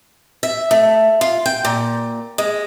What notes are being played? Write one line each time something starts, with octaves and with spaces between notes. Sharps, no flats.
E5
A3
F4
G5
A#2
G#3